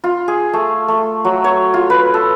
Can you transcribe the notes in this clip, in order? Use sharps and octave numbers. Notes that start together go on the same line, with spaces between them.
F4
G#4
A3
A3
F#3
C#5
F4
B4
A4